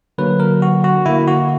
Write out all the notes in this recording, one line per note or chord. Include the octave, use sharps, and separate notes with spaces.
D3 F#3 A#3 B4
A#4
F#4
F#4
D3 A#3 E4
F#4